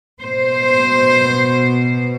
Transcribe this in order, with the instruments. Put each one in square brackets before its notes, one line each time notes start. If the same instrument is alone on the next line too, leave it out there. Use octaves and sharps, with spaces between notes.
[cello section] B2 C5